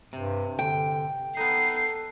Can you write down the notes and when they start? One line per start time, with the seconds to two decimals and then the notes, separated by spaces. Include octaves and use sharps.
0.13 G2 C3
0.59 D3 G5
1.37 B3 D#4 A4 C7